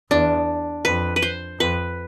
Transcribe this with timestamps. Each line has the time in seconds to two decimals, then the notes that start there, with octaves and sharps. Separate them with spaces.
0.10 E2 D4
0.85 F2 B4
1.16 B4
1.22 C5
1.60 F2 B4